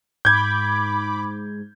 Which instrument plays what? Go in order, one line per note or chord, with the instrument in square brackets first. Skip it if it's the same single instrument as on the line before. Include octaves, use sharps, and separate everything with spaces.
[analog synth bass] G#2 [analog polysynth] B5 D6 [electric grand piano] G6 G#6